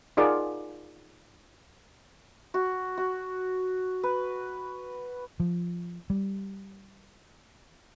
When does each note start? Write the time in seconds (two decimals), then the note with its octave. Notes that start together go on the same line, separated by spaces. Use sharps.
0.17 D#4 F4 G#4 A#4 D5 F#5
2.54 F#4
2.97 F#4
4.03 B4
5.40 F3
6.10 G3